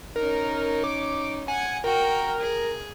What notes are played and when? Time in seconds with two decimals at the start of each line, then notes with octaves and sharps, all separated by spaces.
0.16 C#4 D#4 A#4
0.84 D6
1.48 F#5 G#5
1.84 F#4 A#4 G5
2.40 G#4